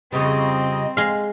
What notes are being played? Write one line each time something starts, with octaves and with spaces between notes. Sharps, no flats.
F2 C#3 G3 C4 D#5
G#3 F5